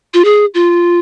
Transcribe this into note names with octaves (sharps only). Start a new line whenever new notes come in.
F4
G#4
F4